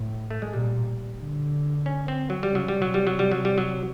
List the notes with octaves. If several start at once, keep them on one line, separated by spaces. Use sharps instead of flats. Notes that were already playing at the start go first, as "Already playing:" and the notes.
Already playing: A2
A3
G#3
A#2 G3
D3
C#4
C4
F#3
G3
C#3 F#3
G3
C3 F#3
G3
F#3
G3
F#3
G3
F#3